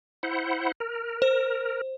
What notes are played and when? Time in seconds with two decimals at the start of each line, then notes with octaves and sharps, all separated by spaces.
0.23 E4 C5 F#5
0.80 A#4
1.22 C5